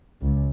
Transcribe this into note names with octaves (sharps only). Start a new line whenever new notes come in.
C#2